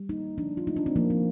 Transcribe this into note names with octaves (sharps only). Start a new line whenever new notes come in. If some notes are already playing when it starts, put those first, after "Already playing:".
Already playing: G3
A#3 D#4
F3 D4
F4
A3 D#4
D4
C4
F3 A#3
C4